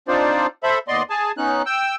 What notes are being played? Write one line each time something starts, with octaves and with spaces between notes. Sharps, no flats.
C4 D4 D#4 F4 C5 D5
A4 C5 E5 B5
D#2 B3 D5 D#5 C6
G#4 G#5 A5
B3 C#4 D#4 F#6
G5 E6